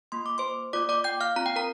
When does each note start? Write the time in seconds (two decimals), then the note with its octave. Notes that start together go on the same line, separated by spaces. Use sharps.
0.12 A#3 F4 C6
0.26 D6
0.38 C5 C6
0.73 A#3 F4 D5 D6
0.89 D5 D6
1.04 G5 G6
1.20 F5 F6
1.36 C4 F4 A#5
1.46 G5
1.56 A#4 A#5